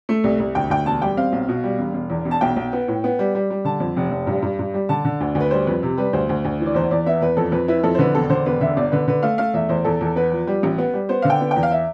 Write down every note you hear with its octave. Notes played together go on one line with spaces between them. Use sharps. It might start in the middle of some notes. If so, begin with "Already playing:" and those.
A3
C2
C2
D2 G5
D2 G5
E1 A5
G3 G5
C4 F5
B1
B2
G3
E1
E1
E2
E1
A5
B1 G5
B1
B3
A2
B3
G3
G3
G3
D3 A5
F2
F1
F1
G2
G2
G2
G3
D3 A5
D3
D2
D2
B4
G3 C5
F2 B4
C3
G3 B4
D2 C5
D2
D2
E3
D5
E2 C5
E2 D5
B3 E5
E2 B4
F2 A4
F2 B4
E4 B4
F2 A4
C5
D3 B4
E1 A4
D3 C5
E1 B4
D3 E5
G1 D5
D3 B4
D3 B4
A3 F5
A3 F5
E2 E5
E2 C5
E2 A4
E2 A4
B3 B4
F3
G3
A1
B3
G3
B3 C5
D3 F5
G5
B3
G5
E2
F5
E5